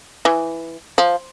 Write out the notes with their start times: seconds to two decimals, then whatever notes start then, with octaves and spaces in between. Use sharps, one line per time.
0.25 E3
0.98 F3